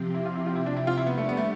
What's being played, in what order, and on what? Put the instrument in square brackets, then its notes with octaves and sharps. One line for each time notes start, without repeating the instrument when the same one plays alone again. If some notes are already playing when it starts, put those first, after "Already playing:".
Already playing: [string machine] C3 F3 C4 G4
[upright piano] E4
F4
E4
F4
E4
D4
E4
F4
E4
[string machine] G3 D4 G4 [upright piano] B3
[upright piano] A3
B3
A3